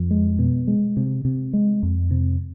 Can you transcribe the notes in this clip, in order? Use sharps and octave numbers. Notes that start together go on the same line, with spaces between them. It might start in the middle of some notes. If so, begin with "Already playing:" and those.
Already playing: F2
G#3
B2
G#3
C3
C3
G#3
F2
C3